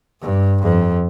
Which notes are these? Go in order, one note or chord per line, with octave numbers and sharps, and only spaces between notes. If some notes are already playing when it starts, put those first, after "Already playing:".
G2
F2